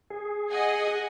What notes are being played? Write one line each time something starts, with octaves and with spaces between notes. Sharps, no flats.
G#4
D#5 F#5 G#5